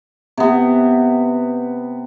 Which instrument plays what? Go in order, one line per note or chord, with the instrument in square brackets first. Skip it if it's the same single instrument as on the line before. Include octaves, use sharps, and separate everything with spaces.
[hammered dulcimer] C3 B3